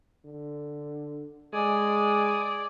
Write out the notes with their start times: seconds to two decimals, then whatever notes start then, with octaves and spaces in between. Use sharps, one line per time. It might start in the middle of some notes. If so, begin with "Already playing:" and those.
0.25 D3
1.53 G#3 D5 G#5 D#6